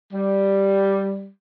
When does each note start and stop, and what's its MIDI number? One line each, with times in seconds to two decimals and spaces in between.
0.13 1.28 55